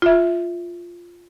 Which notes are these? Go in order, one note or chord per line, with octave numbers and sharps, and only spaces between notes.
F4 E5